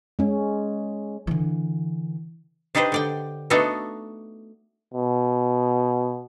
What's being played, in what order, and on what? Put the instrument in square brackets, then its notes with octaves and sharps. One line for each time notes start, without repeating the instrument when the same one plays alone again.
[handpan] G#3 C#4
[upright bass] D3 E3
[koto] D4 D#4 G4 B4 C5
D3 D5 G5
A3 B3 D4 D#4 F#4 A4
[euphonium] B2